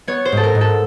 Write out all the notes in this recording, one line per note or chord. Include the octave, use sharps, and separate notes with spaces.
B3 C#5
C5
G#2 A4
A#4
G#2
A4